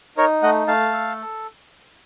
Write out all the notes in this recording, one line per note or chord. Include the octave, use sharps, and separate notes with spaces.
D#4 A#4 C#5
A3 D#5 F#5
A3 F5 A5
A4